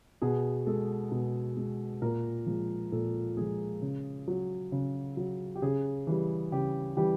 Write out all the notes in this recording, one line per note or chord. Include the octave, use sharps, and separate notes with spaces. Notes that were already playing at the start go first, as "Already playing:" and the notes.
B2 G#4
G#3 A4
B2
G#3
A#2 A#4
F3 G#3
A#2 A4
F3 G#3 G#4
C#3
F#3
C#3
F#3
G4
C#3 G#4
E3 G3
C#3 G4
E3 G3 G4